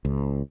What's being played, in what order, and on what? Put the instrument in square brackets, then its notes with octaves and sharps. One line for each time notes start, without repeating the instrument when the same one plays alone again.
[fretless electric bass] C#2